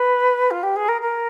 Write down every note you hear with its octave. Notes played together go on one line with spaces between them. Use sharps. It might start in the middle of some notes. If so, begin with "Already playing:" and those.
Already playing: B4
F4
G4
G#4
A#4
A#4